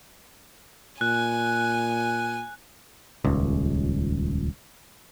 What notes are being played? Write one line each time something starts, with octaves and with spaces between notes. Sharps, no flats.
A#2 G#5 F#6
D#1 C#2